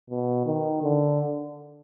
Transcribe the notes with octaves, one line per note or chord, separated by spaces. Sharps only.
B2
D#3
D3